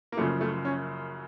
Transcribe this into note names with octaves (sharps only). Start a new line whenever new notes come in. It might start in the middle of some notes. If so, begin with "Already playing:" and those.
A#3
F#1 F#2 C#3 F3 A3
A3
C#4